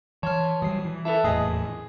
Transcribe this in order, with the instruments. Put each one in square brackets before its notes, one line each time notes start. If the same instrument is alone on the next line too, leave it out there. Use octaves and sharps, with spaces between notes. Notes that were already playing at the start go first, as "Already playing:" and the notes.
[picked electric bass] E3 [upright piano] C#5 [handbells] A5 C6 F6
[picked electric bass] E3 F#3 G3 [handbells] D#6 C7
[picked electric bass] E3
[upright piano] E4 A4 [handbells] B4 E5 A5
[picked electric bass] D#1 E2 A2 [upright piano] G#4 D#5 [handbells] D#6 C7